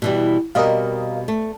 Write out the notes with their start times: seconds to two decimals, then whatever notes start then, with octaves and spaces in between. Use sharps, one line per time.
0.02 B2 E3 G3
0.55 B2 G3 C4 A#4 D#5 F5
1.28 A3